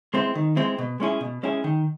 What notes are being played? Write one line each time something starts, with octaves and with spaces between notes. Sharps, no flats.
G#3 C4 E4
D#3
G#3 C4 E4
B2
G#3 C#4 E4 G#4
B2
G#3 C#4 E4 G#4
D#3